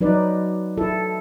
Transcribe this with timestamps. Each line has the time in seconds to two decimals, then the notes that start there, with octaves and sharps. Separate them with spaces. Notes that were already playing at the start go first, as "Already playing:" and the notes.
0.01 F#3 D#4 B4 D5
0.77 E4 A4